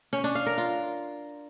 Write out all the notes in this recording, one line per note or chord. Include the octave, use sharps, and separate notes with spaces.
C#4
D4
F5
A#4
F4